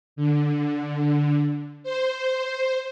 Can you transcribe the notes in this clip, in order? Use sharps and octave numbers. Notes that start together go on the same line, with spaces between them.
D3
C5